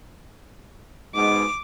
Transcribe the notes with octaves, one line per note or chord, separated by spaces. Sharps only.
G#2 B2 G#3 D6